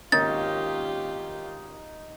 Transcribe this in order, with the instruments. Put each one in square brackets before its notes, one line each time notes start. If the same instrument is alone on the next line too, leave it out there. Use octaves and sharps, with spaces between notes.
[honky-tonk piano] G#1 A#3 C#4 [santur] D#4 [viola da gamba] F4 G4 [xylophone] A6